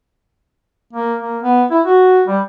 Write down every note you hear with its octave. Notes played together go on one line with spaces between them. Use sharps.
A#3
A#3
B3
E4
F#4
G3